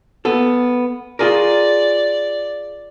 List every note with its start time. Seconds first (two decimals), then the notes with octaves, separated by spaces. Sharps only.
0.25 B3 A4
1.19 F4 G#4 A#4 D5